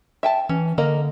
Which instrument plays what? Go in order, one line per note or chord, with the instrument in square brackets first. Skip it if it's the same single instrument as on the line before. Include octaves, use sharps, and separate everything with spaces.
[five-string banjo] E5 G5 A5
[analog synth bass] E3 [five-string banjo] C#4
[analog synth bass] D3 [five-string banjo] A#3 A#4 D#5